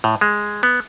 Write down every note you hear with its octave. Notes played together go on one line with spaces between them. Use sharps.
A2
G#3
B3